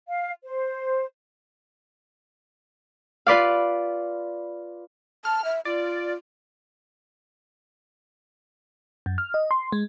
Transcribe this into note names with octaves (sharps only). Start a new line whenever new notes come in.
F5
C5
F4 B4 D5 F5
A5 F6
E5
F4 D5
F#2
F6
D#5
C6
G#3